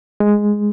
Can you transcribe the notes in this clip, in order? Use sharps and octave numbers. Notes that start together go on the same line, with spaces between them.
G#3